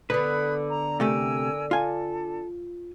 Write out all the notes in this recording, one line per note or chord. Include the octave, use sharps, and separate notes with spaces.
D3 B3 B4 B5 D#6 F#6
A#5
C3 A3 G4 A#4 G#5 E6
F4 A4 G#5